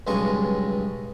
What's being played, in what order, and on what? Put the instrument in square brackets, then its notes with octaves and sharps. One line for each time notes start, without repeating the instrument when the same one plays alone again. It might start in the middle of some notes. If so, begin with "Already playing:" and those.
[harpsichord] B1 G2 C#3 G#3 D#5 C#6